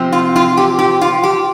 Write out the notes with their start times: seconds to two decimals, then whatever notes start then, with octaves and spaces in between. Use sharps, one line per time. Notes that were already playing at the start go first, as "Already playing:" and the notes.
Already playing: C3 F3 C4
0.12 F4
0.36 F4
0.57 G4
0.79 G4
1.01 F4
1.23 G4